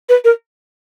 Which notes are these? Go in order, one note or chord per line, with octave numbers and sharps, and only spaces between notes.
B4
A#4